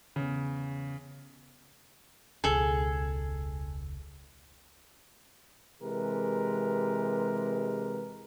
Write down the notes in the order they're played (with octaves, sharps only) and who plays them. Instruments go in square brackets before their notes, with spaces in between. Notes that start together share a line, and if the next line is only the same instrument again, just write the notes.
[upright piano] E2 C#3
[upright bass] E1 C#2 [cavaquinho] G#4 A4
[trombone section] C3 E3 G#3 G4 A#4 B4